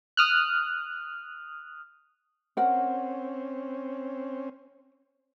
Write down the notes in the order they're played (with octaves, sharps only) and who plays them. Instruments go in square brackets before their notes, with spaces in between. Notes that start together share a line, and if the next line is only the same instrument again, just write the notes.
[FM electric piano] D#6 F6 F#6
[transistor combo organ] C4 C#4 [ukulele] A#4 F#5